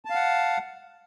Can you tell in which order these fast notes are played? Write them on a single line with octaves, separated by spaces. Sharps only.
A5 F5 F#5